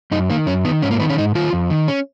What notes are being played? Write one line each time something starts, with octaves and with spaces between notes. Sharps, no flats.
F#2 D#4
D#3 A#3
F#2 C#4
D#3 B3
G#2 C#4
A#3
D#3 B3
C#4
G#2 D#4
D#3 F4
F2
D#3
C#4